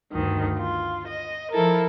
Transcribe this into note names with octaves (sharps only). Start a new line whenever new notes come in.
D2 G2 D#3
F4
D#5
F3 E4 A4 A#4